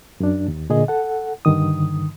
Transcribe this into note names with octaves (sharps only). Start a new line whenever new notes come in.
F#2 D4
D#2
A#2 D3 G#4 D#5
A4 F#5
G2 D3 D#3 D#6